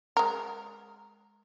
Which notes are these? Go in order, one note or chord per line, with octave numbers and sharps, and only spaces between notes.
G#3 A#4